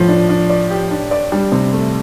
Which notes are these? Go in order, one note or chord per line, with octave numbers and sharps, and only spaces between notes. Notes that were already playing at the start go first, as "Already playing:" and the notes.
Already playing: A2 F3
D4
D4
D5
G4
D4
D5
G3 D4
C3
A3